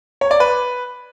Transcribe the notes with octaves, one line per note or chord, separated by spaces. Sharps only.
C#5
D5
B4